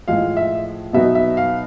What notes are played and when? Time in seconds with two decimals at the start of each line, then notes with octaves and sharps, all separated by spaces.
0.08 A2 F3 G#3 F5
0.37 E5
0.93 B2 F#3 B3 D#4 E5
1.15 E5
1.37 F5